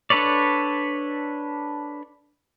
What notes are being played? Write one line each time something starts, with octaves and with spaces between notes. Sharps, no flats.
D4 A4 B4 C#5 D5